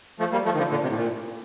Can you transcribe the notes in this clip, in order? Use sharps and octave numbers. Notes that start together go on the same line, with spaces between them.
F3 A3
G3 A#3
F3 A3
D#3
D3 F3
A#2 D3
C3
A2
A#2